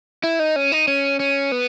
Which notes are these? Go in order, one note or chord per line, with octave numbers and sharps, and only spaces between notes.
E4
D#4
C#4
D#4
C#4
C#4
B3